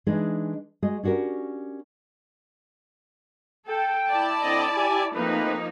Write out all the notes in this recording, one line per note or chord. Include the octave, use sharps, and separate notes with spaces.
E3 G#3 D4 D#4 G#4 D#5
G#3 F#4 G#4 D#5
C#4 D4 F#4 G4 A#4
A4 G5
E4 D5 A5
D3 C4 D#5
G4 G#5
F3 A3 A#3 C4 D#4 B4